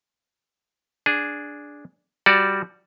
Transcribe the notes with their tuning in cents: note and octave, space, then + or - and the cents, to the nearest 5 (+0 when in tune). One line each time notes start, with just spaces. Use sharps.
D4 -5 G#4 +0
G3 +0 F#4 +0 D5 +0